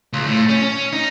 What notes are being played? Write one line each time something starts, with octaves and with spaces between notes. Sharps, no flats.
C#2
A2
C#4
C#4
D#4